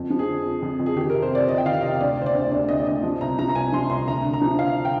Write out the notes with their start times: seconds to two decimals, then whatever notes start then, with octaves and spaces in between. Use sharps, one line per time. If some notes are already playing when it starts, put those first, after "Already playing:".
Already playing: F2
0.10 F3
0.19 G#4
0.28 D3
0.45 F2
0.62 F2
0.80 F2
0.86 G#4
0.96 D#3 G4
1.10 A#4
1.14 C3
1.22 C5
1.31 C3 D5
1.49 C3 D#5
1.58 G5
1.65 D#3 F5
1.83 C3 D#5
2.01 D2 D5
2.18 D3 C5
2.26 D5
2.34 D2
2.51 D2 D5
2.69 D2 D#5
2.80 D5
2.87 D2 D#5
3.03 F3
3.21 C2 A#5
3.39 F3 A#5
3.49 A#5
3.55 C2 G#5
3.72 F3 C6
3.90 C2 C6
4.07 D2 A#5
4.24 D3
4.34 A#5
4.41 F3
4.59 D3 F5
4.85 G5